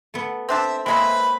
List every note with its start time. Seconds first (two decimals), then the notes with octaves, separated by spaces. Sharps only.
0.14 A3 B3
0.49 C4 D4 E5 A5
0.86 C3 G#3 A#3 C4 B4 C#5 E5 B5